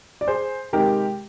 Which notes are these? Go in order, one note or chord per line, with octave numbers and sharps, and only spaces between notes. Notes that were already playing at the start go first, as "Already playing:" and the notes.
D5
G#4 C5
C3 D#3 G#3 D#4 G4 A#4